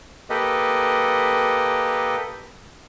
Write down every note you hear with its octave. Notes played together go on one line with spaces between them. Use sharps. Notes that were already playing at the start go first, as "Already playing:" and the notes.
A#3 G4 A4 B4 D#5